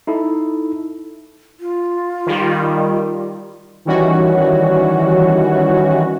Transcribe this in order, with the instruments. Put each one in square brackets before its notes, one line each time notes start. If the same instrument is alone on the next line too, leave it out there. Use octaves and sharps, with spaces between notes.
[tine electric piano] D#4 E4 A4
[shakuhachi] F4
[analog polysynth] D#3 G3
D#3 E3 G3 C#4 F#4